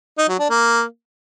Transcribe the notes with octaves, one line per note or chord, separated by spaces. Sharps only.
D#4
F#3
D4
A#3